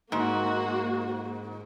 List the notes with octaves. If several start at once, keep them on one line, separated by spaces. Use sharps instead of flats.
G#2 A#3 F#4